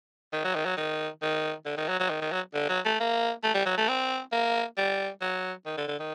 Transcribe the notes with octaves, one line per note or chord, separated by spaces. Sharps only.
D#3
F#3
D#3
F#3
D#3
D#3
D3
D#3
F#3
F#3
D#3
D#3
F#3
D3
F#3
A3
A#3
A3
G3
F#3
A3
C4
A#3
G3
F#3
D#3
D3
D3
D#3